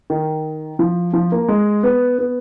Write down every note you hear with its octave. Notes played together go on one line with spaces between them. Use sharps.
D#3
F3
F3
A#3
G#3
B3
B3